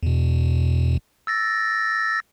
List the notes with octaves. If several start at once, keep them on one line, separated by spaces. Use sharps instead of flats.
E2 B2
E6 A6 A#6